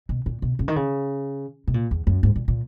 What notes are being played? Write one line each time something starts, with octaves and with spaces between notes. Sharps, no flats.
B2
A#2
B2
C#3
D#3
C#3
B2
A#2
E2
F#2
G#2
A#2
A#2